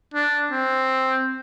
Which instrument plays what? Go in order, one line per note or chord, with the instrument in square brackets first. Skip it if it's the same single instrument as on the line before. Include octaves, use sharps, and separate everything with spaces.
[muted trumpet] D4
C4